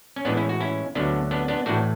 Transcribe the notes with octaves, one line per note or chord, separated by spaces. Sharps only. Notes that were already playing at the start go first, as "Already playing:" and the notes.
C#4
A2 E3 G#3 B3 D4
C#4 E4
F#4
C#4 E4
D2 D3 F#3 B3 D4
B3 D4
B3 D4
A2 E3 A3 D4 F#4